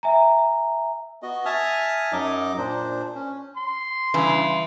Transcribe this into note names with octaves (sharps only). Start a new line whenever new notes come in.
E5 G#5 A#5
B3 F#4 D#5
E5 G#5 A5 D#6 F6
F#2 F#3 D#4 D#5 D6
A#2 D4 C5
C#4
C6
G2 C#3 E3